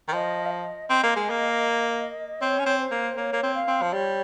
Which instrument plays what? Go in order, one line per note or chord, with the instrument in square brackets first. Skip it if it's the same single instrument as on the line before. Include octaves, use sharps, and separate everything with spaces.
[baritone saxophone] D#3
[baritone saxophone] F3 [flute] D#5
[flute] F5
D#5
[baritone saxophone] C4 [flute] D#5
[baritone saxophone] A#3
G#3
A#3
[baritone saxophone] C4 [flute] C#5
[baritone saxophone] C#4
C4
[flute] C5
[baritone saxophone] A#3
[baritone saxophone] A#3 [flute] C#5
[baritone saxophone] A#3
C4
[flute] F5
[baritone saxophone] C4
F3
[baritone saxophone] G3 [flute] C#5